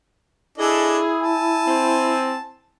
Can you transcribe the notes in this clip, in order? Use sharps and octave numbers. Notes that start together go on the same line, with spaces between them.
D4 E4 G#4 A4 D#5
G#5 A5
C4